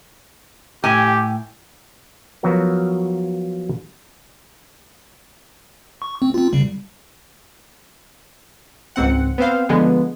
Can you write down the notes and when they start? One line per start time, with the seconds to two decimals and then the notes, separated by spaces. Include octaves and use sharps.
0.84 A2 G4 G#5
2.43 F3 F#3 B3 F#4 A#4
6.02 C#6
6.22 C4
6.34 C4 F4
6.53 C#3 G3
8.96 C#2 G#2 C4 F#5
9.38 B3 C4 C5 F5
9.69 D3 F3 G#3 B3